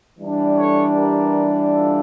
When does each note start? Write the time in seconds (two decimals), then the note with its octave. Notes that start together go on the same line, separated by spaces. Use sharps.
0.19 E3 G3 D4
0.57 A4 C#5
0.95 G4 A#4
1.71 F4 A4